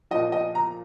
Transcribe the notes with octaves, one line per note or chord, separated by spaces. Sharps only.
A#2 F3 D#5
D#5
A#5